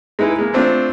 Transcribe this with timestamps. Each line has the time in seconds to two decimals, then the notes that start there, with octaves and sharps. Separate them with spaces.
0.19 G#3 D#4 E4 B4
0.38 G#3 A#3
0.54 A3 C4 D4 F4